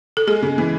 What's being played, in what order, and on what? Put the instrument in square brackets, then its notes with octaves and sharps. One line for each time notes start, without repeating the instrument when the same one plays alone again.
[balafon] A4
[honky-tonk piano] G#3 [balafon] G#4
[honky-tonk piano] C#3
E3